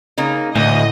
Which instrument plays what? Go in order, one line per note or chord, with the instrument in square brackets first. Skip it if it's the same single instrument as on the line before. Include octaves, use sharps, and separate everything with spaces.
[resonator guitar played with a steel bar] C#3 A#3 D#4
[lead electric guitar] D2 [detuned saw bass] A2 [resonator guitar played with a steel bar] E3 [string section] D#5